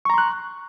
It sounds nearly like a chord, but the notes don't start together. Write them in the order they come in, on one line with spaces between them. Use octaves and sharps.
C#6 A#5 C6 F#6